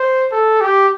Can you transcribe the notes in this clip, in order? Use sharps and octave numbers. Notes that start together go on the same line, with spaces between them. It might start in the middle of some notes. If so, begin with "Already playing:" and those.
Already playing: C5
A4
G4